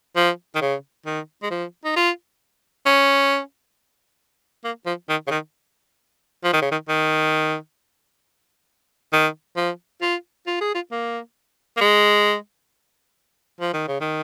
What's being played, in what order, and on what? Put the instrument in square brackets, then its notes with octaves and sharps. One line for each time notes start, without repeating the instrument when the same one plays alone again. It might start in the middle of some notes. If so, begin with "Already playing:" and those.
[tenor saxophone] F3
D#3
C#3
D#3
G#3
F3
D#4
F4
C#4
A#3
F3
D#3
C#3
D#3
F3
D#3
C#3
D#3
D#3
D#3
F3
F4
F4
G#4
F4
A#3
A#3
G#3
F3
D#3
C#3
D#3